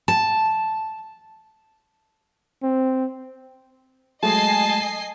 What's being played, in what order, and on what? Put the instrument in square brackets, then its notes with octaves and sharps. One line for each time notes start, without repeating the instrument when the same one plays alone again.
[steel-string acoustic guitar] A5
[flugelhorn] C4
[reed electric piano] F#3 G#3 A3 [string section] D#5 G#5 C7 [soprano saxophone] A5